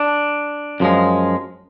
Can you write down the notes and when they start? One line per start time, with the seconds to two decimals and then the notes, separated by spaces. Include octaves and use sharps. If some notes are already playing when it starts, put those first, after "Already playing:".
Already playing: D4
0.80 F#2 F3 G#3